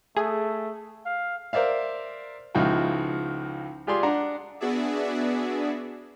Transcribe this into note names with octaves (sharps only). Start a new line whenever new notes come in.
A3 G#4
F5
A#4 C5 D5 E5 F5
C#2 F3 D#4 E4 F#4 G5
F4 G4 G#4 D5 C6
D4 F#5 A#5
B3 D4 F#4 G#4 D5 E5